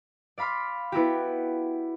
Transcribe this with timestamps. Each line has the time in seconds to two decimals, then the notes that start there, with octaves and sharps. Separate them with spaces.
0.38 D5 F5 B5 C6 F6
0.92 B3 E4 F#4 G4